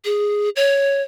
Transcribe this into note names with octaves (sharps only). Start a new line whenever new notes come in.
G#4
C#5